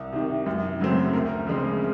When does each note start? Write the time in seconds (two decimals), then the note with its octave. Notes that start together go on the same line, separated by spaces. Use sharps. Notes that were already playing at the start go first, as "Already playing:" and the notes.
Already playing: C2
0.12 C3 D#3
0.46 F#2
0.80 C#3 F#3 A3 C4
1.13 D2 A#4
1.47 C#3 F3 G#3 C4